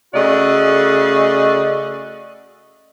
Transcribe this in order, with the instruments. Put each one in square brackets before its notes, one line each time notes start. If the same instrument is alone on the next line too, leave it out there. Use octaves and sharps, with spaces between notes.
[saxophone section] C#3 A3 F#4 D5 D#5